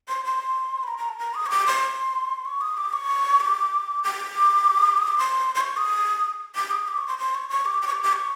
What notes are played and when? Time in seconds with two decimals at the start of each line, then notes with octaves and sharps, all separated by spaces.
0.08 C6
0.25 C6
0.83 B5
0.88 A#5
0.98 A#5
1.09 A5
1.19 A#5
1.34 D#6
1.46 C#6
1.50 D6
1.66 C6
2.45 C#6
2.61 D#6
2.77 D6
2.93 C#6
3.40 D6
4.04 D6
4.97 D#6
5.08 D6
5.18 C6
5.55 C6
5.61 C#6
5.77 D#6
6.56 D6
6.71 D#6
6.88 D6
6.98 C#6
7.08 C6
7.18 C6
7.35 C#6
7.50 C#6
7.66 D6
7.82 D6
7.87 C#6
7.92 D6
8.03 D6
8.13 C#6